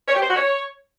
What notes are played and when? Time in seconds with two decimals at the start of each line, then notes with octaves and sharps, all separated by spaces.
0.08 C#5
0.15 G4
0.22 C5
0.29 F#4
0.36 C#5